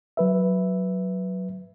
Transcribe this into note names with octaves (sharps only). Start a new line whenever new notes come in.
F#3 B4 E5